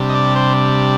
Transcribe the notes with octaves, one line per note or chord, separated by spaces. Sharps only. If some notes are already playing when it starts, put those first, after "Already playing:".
Already playing: C3 G3 D4
D#5
D5
C5